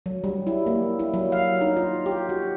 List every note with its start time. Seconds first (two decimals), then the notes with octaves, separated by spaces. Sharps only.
0.06 F#3
0.24 G3
0.47 E4
0.66 A#3
0.99 E4
1.14 F#3
1.32 F5
1.61 D#4
1.77 F4
2.06 G4
2.29 F#4